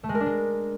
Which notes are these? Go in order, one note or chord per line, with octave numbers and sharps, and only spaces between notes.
A3
G#3
A#4
D4
G#3